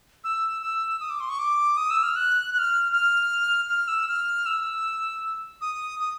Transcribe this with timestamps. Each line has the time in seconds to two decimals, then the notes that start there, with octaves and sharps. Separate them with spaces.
0.24 E6
0.62 E6
1.00 D#6
1.10 D6
1.20 C6
1.30 C#6
1.39 D6
1.77 D#6
1.90 E6
2.03 F6
2.16 F#6
2.54 F#6
2.59 F6
2.92 F6
3.69 F6
3.88 E6
4.08 F6
4.46 E6
5.61 D#6
6.00 D#6